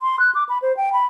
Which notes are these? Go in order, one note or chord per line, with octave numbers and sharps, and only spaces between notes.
C6
F#6
D6
B5
C5
G5
B5